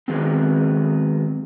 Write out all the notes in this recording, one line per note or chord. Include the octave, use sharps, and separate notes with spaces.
D#3 F#3 G#3 B3 C4